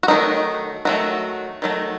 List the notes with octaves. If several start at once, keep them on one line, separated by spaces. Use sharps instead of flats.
F#4
D#3 F#3 A3 D#4
D#3 F#3 A3 F#4
D#3 F#3 A3